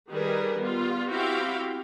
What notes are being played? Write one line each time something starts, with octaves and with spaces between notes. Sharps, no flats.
D#3 G3 G#4 A#4 B4
G3 B3 F4
C4 E4 F#4 G4 F5 G5